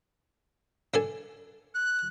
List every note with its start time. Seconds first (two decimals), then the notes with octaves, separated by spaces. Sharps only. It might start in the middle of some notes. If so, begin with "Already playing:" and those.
0.94 D4 A4 G#5
1.75 F#6